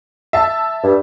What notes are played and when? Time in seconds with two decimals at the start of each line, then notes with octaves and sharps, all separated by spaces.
0.33 E5 A5
0.83 G2